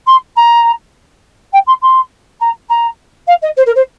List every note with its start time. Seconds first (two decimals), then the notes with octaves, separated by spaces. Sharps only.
0.06 C6
0.36 A#5
1.53 G5
1.66 C6
1.82 C6
2.40 A#5
2.69 A#5
3.27 F5
3.42 D#5
3.57 C5
3.66 A#4
3.75 C5